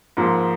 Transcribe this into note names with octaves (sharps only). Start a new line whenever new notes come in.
G#2 F3 A#3